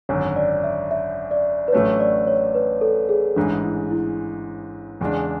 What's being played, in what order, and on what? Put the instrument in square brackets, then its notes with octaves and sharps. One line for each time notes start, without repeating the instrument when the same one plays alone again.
[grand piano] G#1 F#2 D3 [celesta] C#5
[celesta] D5
E5
E5
D5
B4
[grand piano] A1 A2 F#3 A3 D4 [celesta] C#5
[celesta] D5
C#5
B4
A4
G#4
[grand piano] A1 G#2 E3 G#3 [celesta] D4
[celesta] E4
E4
[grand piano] E2 C#3 G#3 D4